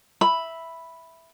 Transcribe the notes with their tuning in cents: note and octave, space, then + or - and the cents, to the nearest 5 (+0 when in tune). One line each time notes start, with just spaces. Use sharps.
E5 +0 B5 +0